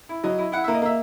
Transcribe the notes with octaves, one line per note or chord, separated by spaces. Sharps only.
E4
F#3 D#5
E4
E4 F#5
A#3 E5
D#5
A#3 E5